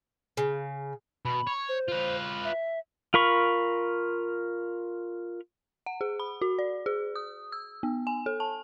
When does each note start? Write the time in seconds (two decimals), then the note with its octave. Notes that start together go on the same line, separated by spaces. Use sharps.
0.37 C#3
1.25 B2 B5
1.47 C#5
1.69 C5
1.88 F4 B4
2.44 E5
3.14 F4 A#4 B5 C#6
5.86 F#5
6.01 G#4
6.20 B5
6.42 F#4
6.59 D5
6.86 G#4
7.16 D#6
7.52 E6
7.83 B3
8.07 G#5
8.26 A4
8.40 A5